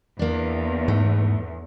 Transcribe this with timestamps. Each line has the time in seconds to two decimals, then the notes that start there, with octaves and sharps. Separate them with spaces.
0.19 E2 A#3 D4
0.88 G#2 A3